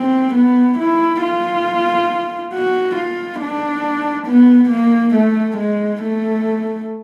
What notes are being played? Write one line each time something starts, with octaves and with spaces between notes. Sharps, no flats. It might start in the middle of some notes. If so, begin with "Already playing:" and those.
Already playing: C4
B3
E4
F4
F#4
F4
D4
B3
A#3
A3
G#3
A3